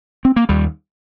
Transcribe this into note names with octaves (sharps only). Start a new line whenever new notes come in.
C4
A#3
D#2 G3